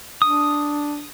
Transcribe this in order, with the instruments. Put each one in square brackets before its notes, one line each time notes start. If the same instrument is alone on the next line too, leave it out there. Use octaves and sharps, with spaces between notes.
[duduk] D4 [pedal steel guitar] D#6